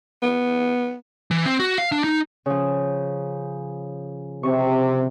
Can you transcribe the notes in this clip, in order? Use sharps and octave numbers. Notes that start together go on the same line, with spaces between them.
B3
E3
C4
F#4
F5
D4
D#4
C#3 F3
C3 C#6